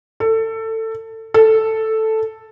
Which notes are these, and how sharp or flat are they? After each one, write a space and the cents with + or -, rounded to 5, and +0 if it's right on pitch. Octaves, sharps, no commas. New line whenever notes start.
A4 +20
A4 +0